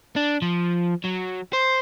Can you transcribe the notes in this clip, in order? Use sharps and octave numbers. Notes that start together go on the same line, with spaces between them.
D4
F3
F#3
C5